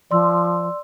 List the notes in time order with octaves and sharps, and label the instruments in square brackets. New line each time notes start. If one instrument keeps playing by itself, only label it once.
[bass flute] F3 [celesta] D5 C6 E6